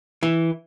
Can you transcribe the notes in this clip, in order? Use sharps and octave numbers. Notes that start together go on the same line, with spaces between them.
E3